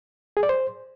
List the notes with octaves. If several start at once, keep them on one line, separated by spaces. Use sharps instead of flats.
G#4
D5
C5